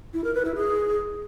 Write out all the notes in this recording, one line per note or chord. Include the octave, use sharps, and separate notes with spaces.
E4
A#4
B4
E4
G#4